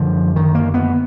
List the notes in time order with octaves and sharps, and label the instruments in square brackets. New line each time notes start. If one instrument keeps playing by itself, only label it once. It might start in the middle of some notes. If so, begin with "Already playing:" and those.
Already playing: [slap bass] F#2 D3 F3
D#3
A#3
B3